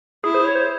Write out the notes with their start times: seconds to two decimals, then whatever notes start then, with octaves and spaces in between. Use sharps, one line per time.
0.24 E4 G#4
0.34 C5
0.44 C#5
0.55 C5